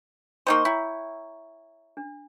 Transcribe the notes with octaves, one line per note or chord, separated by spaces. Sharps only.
A#3 D#4 C5 G5 C#6
E4 C#5 G5 A#5
D4